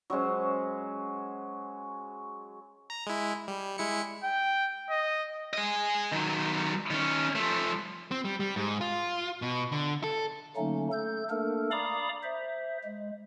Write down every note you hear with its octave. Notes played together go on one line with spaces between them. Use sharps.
F#3 G#3 C#4 C5
A#5
G#3 E4
G3
G#3 E4 C#7
G5
D#5
G#4 D#5
D#3 F#3
D#3 C#4
F3 A3
C4
G3
G3
G#2
F4
B2
D3
A4
D3 F#3 A3 A#3 C#4 D#4
A3 A4 G6
A3 A#3 D4 A4 A#4
D5 F5 A#5 B5 D6 D#6
C5 E5
G#3